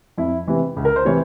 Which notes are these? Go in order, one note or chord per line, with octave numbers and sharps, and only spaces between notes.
F2 E4
C3 E3
C#2
A#4
C5
C3 E3 C#5